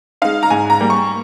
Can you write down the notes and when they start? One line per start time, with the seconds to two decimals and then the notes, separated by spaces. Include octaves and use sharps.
0.22 G#3 D#4 F5
0.43 A#5
0.50 G#2 G#5
0.70 A#5
0.80 G3 A#3
0.90 C#6